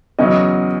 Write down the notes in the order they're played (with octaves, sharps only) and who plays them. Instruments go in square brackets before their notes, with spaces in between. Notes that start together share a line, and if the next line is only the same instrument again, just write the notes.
[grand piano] E2 C#3 F#3 C#4 [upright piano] D#5